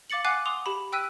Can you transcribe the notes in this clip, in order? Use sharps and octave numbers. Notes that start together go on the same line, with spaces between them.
F5 D6 A6 C#7 F#7
F#5 G#5 D6 F#6 C7
C6 D6 D#6 F7
G4 B5
G5 E6 F#6 B6 D#7